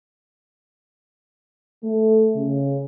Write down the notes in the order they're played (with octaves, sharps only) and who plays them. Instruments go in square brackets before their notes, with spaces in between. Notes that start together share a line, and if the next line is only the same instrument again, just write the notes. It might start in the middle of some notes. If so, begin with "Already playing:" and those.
[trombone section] A3
C#3